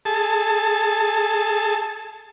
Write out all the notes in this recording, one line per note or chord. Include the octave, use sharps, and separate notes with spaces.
G#4 A4 A5